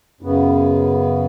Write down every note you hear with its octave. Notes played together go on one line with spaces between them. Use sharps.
F#2 C#3 B3